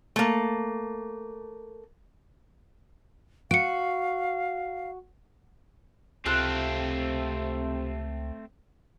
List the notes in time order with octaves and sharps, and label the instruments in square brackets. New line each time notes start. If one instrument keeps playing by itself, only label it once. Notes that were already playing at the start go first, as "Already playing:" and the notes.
[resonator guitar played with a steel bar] A3 A#3
[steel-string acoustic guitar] F#4 [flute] F5 [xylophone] C#7 D7
[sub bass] C#2 [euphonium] C3 [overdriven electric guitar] A3 C4 [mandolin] F4 A4 F#6